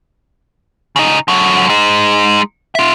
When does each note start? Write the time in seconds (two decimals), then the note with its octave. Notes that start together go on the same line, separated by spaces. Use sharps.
0.96 C#3 D#4
1.28 D3 F#3
1.70 G#3 D#4
2.75 F4 E5